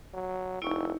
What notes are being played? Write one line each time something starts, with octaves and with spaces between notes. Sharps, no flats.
F#3
F1 D#4 E4 C#6 D7